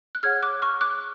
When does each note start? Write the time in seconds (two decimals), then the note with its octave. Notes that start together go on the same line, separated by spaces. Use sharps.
0.15 F#6
0.23 G#4 C#5 F#5 F6 G#6
0.43 D6 F#6
0.62 C#6 F6
0.81 D6 F#6